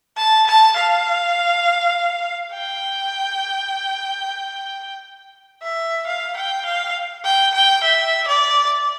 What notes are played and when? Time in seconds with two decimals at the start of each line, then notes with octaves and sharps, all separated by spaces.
0.17 A5
0.47 A5
0.76 F5
2.53 G5
5.63 E5
6.07 F5
6.36 G5
6.65 F5
7.25 G5
7.54 G5
7.83 E5
8.28 D5